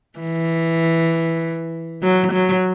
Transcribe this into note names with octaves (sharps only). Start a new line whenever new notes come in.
E3
F#3
F#3